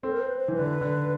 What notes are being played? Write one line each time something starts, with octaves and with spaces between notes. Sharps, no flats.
C4 A4
A#4
C5
B4
C5
E3
D3 B4
D3